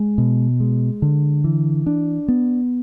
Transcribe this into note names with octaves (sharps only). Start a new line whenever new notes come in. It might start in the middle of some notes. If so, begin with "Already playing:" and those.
Already playing: G#3
B2
G#3
D3
E3
D4
B3